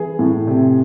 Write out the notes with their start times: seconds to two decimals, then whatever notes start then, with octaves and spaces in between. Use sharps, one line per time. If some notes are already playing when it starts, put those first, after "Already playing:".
Already playing: E3 G#4
0.19 A2
0.47 C3